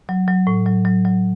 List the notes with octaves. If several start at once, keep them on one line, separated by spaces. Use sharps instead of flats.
F#3
F#3
A2
F#3
F#3
F#3